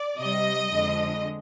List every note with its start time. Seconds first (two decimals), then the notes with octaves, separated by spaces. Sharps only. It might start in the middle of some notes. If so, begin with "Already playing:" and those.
Already playing: D5
0.20 C3 G3 D#5
0.72 F2 D3 G#3